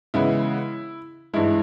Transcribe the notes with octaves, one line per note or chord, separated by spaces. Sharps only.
C#3 E3 G#3 B3 E4
G2 E3 G#3 E4